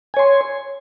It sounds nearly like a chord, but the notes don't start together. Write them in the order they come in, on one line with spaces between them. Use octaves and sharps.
G#5 C#5 C6